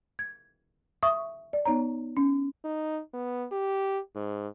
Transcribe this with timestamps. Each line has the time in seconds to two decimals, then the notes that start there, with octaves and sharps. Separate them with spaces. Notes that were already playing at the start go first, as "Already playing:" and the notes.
0.19 G#6
1.03 E5 C#6 D#6
1.53 D5
1.65 B3 D#4 C#5 A#5
2.17 C#4
2.64 D#4
3.13 B3
3.52 G4
4.15 G#2